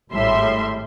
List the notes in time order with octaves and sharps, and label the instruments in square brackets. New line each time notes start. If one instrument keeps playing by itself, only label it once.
[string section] G#1 A2 G3 E5 C6